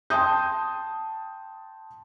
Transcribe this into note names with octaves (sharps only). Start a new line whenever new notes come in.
G5 A5 C6 D#6 G6